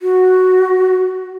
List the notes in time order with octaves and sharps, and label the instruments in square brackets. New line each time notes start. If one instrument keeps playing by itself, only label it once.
[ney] F#4